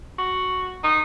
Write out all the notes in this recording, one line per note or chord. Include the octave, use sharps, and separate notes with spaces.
F#4
D#4